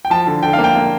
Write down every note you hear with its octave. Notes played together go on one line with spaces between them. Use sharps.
G5
F3 A5
D3
D3 G5
F5
A#3
G5
A#3